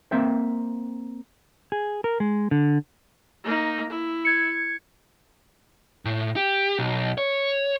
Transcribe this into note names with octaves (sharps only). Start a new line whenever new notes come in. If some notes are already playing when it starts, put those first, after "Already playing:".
A#3 C4 E5 G5
G#4
A#4
G#3
D3
A#3 D#4
E4
G#6 C#7
A2
G4
B1
C#5